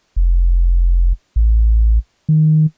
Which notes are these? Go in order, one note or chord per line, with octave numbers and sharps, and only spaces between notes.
F1
A1
D#3